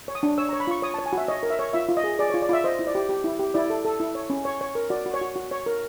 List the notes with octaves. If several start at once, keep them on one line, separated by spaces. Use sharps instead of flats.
C#5
D#6
D4
C#5 E6
A#5
C#5
B5
F4 C#6
C#5 D#6
A5
C#5
G#5
F#4 E5
C#5 D#5
A#4
E5
C#5
F4 E5
F4
D#5
G#4
G#4 D5
C#5
F4
D5
F4 E5
C5 D#5
E4
D5
G4
G4
E4
G4
E4 D5
A4
A4
E4
C#5
C#4
C#5
C#5
A#4
F#4 D5
F#4
C#5
F#4
F#4
C#5
A#4